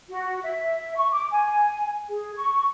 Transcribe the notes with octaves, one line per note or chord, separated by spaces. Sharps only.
F#4
E5
C#6
D6
G#5
G#4
C#6